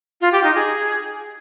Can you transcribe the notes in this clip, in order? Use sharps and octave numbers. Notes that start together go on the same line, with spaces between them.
F4
G4
D#4
G#4